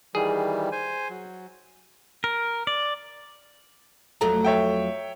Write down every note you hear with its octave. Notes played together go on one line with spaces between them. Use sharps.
D#3 E3 G3 G#4
C5 G#5
F#3
A#4
D5
F2 F#3 A3 A#5
C#5 E5 G5